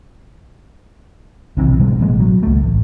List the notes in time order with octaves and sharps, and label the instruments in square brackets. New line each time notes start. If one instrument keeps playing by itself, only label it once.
[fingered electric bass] B1 C3 D#3 E3
B2 G3 G#3
A1 B2 G#3
F#3
C#2 A3
A1